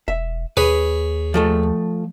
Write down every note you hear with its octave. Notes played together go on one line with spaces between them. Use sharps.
E1 E5
D#2 G#4 B4 C#5 B5
F3 A3 A4